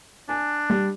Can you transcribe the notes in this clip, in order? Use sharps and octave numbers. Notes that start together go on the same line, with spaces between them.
D4 G#5
G3